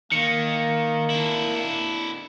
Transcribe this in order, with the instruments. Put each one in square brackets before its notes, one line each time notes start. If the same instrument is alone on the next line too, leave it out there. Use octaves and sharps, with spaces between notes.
[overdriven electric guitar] D#3 [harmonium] A#3 [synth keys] C#7
[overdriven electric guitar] D4 E4